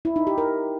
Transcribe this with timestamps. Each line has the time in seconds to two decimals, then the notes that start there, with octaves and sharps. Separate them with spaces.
0.05 E4
0.16 D#4
0.27 G4
0.38 A#4